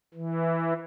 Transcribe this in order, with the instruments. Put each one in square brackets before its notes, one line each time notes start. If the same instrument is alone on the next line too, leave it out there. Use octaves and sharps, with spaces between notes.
[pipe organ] E3